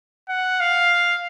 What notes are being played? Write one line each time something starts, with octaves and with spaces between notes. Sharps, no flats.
F#5
F5